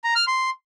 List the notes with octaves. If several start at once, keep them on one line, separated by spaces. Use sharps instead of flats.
A#5
F6
C6